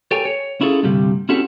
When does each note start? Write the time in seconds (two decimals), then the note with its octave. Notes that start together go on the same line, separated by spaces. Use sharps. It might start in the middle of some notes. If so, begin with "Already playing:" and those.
0.11 G4 A4 A#4 C#5 G5 G#5
0.25 C#5
0.61 C#4 E4 F4 G#4 A4
0.83 D2 G2 C3 G3 G4
1.29 C4 C#4 E4 F#4 G4 A4